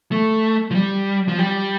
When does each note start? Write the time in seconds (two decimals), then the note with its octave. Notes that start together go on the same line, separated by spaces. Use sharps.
0.11 A3
0.71 F3
0.75 G3
1.28 F3
1.39 G3